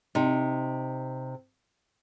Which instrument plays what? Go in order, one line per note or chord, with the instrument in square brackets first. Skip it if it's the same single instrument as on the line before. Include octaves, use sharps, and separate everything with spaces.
[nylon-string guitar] C3 D#4